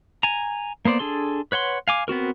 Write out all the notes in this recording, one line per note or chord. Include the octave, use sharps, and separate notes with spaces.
G#5 A#5
A#3 B3 C5 D5
D4 G#4 A4 C6
B4 C#5 F#5 C6
F5 G#5 D6
B3 C4 F#4 A#4